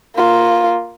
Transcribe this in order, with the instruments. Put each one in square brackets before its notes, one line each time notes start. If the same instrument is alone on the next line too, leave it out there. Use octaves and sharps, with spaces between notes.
[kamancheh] A#3 F4